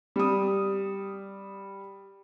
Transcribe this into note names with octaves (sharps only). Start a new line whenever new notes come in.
G3 D#6